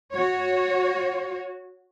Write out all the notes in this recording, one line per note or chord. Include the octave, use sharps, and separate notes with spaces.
F#4 C#5